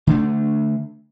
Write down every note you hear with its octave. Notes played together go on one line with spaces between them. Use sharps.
D3 A3 D4